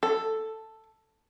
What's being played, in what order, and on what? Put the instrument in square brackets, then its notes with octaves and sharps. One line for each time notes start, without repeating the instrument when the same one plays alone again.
[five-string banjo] A4